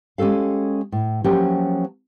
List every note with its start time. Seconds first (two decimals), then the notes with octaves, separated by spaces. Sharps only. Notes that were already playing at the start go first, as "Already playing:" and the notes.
0.18 G#3 C#4 G4 A4 F5
0.92 A2
1.24 F3 F#3 A#3 C#4 G4